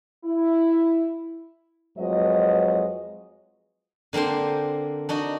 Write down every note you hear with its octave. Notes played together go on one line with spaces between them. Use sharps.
E4
F2 F#3 G#3 B4 D#5
D3 A#3 C4 D4 C5
D4 D#4 F#4